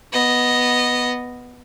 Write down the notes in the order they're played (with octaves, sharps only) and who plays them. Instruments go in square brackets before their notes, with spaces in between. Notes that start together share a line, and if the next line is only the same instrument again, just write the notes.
[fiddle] B3 D#5